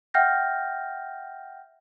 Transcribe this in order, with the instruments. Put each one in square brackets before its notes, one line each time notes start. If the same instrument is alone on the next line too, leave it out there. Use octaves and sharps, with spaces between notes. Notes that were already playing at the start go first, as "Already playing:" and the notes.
[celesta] E5 F#5 G5 F6 G6 A#6